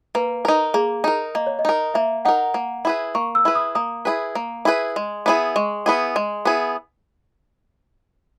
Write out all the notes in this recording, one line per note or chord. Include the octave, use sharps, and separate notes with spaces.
A#3 B4
D#4 A#4
A#3 G#4
D#4 A#4
A#3 D#5
C#5
D#5
D#4 A#4
A#3 E5
D#4 A#4 F#5
A#3
E4 G#4 B4
A#3 C#6
E6
E4 G#4 B4
D#6
A#3 D#6
E4 G#4 B4
A#3
E4 G#4 B4
G#3
B3 E4 G#4
G#3 C#6
B3 E4 G#4
G#3
B3 E4 G#4